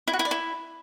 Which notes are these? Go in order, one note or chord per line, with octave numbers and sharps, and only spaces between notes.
E4
F#4
E4
D5
E4